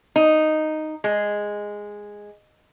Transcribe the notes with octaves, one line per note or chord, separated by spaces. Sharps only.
D#4
G#3